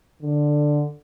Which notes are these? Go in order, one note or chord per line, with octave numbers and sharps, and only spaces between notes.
D3